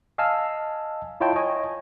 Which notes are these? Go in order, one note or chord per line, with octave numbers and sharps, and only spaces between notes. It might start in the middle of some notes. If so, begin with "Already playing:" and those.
D#5 F5 G#5 A5 E6 F6
E4 F4 C#5 D#5 G5 A5
C#5 D#5 G#5